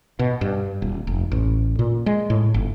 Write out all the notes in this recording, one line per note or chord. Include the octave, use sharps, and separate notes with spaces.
B2
G2
D#1
F1
A1
A#2
G#3
A2
G1